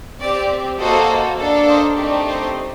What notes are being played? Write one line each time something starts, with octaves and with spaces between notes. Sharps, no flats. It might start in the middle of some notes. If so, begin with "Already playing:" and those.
C4 G4 D5
A#3 F#4 A4 C5 D#5
A#3 D4 A4
C5 D#5
A3 C4 D#4 G4 D5
C5 D#5